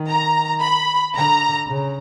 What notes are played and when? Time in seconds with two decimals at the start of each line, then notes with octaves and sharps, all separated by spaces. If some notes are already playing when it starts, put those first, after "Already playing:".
Already playing: D#3
0.12 A#5
0.64 B5
1.16 D3 A#5
1.68 C#3